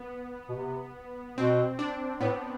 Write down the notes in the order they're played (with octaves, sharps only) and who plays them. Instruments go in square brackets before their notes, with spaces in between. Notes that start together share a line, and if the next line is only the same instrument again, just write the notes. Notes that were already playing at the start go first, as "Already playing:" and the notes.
Already playing: [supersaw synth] B3
[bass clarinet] B2
C3
[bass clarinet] B2 [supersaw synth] C4
[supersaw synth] D4
[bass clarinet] A2 [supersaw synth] B3